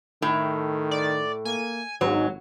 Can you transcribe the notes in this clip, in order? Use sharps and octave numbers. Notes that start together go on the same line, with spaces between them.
A2 D#3
D5
A#3 G#5
G#1 G#2 F#3